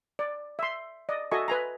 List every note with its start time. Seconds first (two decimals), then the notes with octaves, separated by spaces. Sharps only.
0.19 D5
0.59 E5 C6
1.09 D5 D#5
1.31 F#4 A4 D#5 E5 G#5 C#6
1.48 B4 G#5 A#5